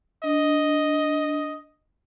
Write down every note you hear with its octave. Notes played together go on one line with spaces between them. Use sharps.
D4 D#5